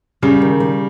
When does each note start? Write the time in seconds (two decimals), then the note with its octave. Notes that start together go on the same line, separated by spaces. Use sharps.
0.22 C#3 G3
0.42 D#3
0.60 G3